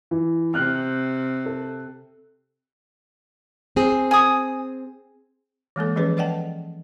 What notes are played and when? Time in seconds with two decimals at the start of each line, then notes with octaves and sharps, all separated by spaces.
0.11 E3
0.54 C3 F6 F#6
1.46 A4
3.76 C4 G#4
4.11 G#5 D#6
5.76 E3 G#3 A#3 A4
5.96 E3 F3 C#4 G#4 B4
6.17 B4 D5 D#5 F#5 G5 A5